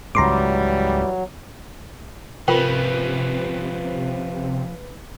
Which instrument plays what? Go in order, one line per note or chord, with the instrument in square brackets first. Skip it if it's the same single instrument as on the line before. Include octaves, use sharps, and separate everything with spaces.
[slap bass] C#2 G#2 [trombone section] E3 G3 [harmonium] F#3 [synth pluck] A#5 C6 D6
[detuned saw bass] C3 [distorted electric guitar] F3 C#4 [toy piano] F4 A#4 G5 [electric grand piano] B4